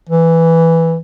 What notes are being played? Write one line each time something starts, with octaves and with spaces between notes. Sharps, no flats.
E3